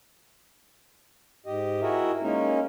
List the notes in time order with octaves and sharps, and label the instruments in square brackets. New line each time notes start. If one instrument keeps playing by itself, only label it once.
[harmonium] G#2 G4 D#5
E4 F#4 G#4 A#4 D#5 E5
G#3 A#3 C#4 D#4 A#4